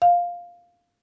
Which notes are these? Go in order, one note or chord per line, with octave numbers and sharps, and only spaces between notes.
F5